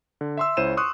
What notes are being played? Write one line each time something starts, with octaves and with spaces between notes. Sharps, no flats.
D3
E5 C6 E6
C#2 E4 C5 C#5 D#7 E7
C6 C#6 D#6 F#6